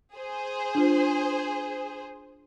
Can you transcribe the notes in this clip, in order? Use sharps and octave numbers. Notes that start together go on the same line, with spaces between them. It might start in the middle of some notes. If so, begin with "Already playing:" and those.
G#4 C5
D4 F4